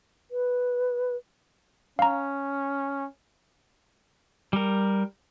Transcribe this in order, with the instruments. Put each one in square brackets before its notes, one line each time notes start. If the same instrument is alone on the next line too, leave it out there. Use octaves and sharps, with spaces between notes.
[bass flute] B4
[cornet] C#4 [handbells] F5 A#5
[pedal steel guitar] G3 A#4